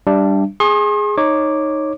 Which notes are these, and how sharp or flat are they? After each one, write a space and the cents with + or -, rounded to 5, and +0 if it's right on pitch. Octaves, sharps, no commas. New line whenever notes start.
G3 +0 D4 +0 E5 +30
G#4 +0 C6 +45 D#6 -25
D#4 -5 C#5 -15 D6 +0